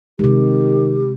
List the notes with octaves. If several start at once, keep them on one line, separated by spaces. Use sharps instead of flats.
C3 D#3 G#3 G4